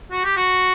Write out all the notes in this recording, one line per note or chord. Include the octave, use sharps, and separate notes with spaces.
F#4
G4
F#4